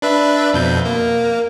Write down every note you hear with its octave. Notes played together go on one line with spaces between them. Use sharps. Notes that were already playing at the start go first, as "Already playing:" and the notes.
D4 B4 E5
F2 B2 G6
A#3